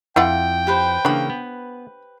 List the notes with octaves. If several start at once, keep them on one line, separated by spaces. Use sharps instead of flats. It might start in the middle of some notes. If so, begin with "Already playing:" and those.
F2 E4 F4 F#5 G5
G4 B4 C5
C#3 E3 A#3 D4 B5
B3